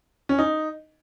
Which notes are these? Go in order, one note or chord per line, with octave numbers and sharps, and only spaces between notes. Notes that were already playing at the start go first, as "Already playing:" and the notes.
C#4
D#4